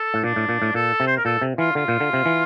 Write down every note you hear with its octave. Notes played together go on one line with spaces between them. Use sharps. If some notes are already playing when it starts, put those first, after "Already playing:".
Already playing: A4
A2
A#2 D4
A2
A#2
A2
A#2 A4
C3
C5
A#4
A#2 A4
C3
E3 F4
D3 F4
A#2
D3
C3
E3